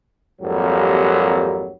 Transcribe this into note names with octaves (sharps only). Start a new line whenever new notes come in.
G#1 F2 F#3 G3 A#3 G4